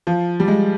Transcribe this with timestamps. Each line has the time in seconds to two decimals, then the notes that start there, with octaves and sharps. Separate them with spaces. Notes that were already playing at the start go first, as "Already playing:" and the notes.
0.07 F3
0.40 G3
0.48 G#3